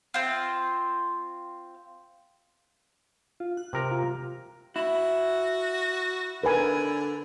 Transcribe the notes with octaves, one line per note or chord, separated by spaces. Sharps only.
C4 F4
F4
F#6
C3 A#4 A#5
F4
E4 F#4
D3 A#4 B4 G#5